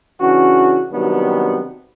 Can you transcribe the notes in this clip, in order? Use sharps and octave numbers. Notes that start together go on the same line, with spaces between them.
C#3 E3 C#4 D4 F#4
C3 D#3 F#3 G3 B3 D4